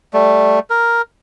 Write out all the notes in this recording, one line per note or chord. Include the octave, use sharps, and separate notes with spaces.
G3 A3
A#4